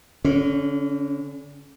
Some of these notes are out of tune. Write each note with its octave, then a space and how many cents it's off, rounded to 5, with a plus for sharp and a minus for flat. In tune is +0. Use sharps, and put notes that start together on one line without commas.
D3 -35 C#4 +0